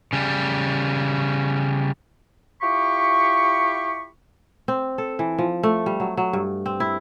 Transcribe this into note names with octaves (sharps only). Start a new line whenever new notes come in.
C#3 G3
E4 F4 G4 B5 C#6
C4
A4
E3
F3
A3
G3
F#3
F#3
G2
C4
E4